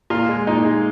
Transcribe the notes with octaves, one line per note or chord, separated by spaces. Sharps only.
A#2 F4
G#3
A#2 D#4
G#3